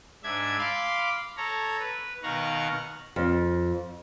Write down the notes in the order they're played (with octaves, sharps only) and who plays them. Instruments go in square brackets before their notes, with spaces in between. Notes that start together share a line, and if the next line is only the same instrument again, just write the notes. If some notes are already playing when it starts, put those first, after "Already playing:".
[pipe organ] G#2 D4 E5 G#6
F5 B5 C6 D6
A4 C#5 A#5
B4
B2 D#3 F5 F#5 A#5 C#6
[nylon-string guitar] F2